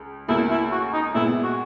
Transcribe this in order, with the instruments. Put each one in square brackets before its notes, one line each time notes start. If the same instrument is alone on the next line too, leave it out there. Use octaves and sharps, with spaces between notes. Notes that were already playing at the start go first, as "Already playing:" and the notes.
Already playing: [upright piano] C#2
[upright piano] C#2 B2 A#3 [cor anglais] E4
[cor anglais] E4
F#4
D#4
[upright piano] A#2 G#3 B3 [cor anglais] E4
[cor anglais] F#4